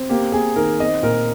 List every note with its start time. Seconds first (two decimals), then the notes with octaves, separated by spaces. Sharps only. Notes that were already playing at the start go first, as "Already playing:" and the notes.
Already playing: C4
0.09 A#3 G4
0.32 A#3 G#4
0.56 D#3 A#4
0.80 C4 D#5
1.02 A#2 A#4